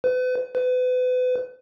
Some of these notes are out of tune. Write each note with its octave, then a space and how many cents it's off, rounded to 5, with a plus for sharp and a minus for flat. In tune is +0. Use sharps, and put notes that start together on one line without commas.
B4 +40
B4 +35